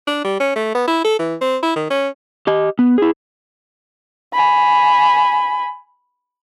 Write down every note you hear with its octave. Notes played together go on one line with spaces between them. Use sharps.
D4
G3
C#4
A3
B3
E4
A4
E3
C4
E4
D#3
C#4
G4 D#5
B3
E4 G#4
G#5 B5